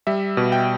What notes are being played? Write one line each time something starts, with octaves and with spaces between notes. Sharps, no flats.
G3 E5
B2
G5